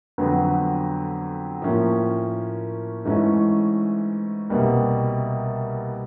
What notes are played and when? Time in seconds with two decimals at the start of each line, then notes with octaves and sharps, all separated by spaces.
0.18 F2 D3 F#3 B3
1.62 A2 F3 A#3 C#4
3.05 G#2 E3 A3 C#4
4.49 C2 B2 G3 A#3